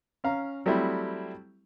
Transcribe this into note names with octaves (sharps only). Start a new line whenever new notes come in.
C#4 F5 A#5
F#3 G3 A3 C4 E4